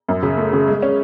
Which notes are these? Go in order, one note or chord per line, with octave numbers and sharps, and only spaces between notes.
F#2
C#3
A3
C#3
G#3
C#4